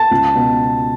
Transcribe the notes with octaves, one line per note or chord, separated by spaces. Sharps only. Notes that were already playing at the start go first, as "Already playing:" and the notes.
Already playing: A5
C#2
B2